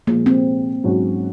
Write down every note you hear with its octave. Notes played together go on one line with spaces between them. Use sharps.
A#2 F3 G#3 A#3
C4
G#2 F#3 C#4 F#4